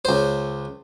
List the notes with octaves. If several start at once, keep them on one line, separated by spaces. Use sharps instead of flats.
C#2 C5